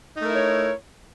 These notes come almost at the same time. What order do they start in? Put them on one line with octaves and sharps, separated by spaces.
D#4 A3 A#4 E4 C#5